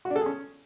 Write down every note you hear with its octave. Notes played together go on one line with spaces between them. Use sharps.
F#4
D4
A4
G#4
C#4